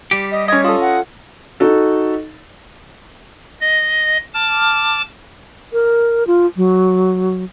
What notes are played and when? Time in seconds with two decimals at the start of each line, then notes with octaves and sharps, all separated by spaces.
0.11 G3 G4
0.32 D#5
0.48 C#4 D#5 G#6
0.64 F4 A4 D#6
0.81 F#5
1.60 D#4 F#4 A4
3.61 D#5
4.34 A5 D6 F6
5.73 A#4
6.27 F4
6.56 F#3